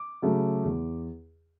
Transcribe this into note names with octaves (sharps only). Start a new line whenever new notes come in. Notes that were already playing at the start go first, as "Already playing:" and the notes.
Already playing: D6
C#3 F#3 A3
E2